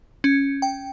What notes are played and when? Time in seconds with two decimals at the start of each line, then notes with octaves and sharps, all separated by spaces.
0.24 C#4
0.62 G5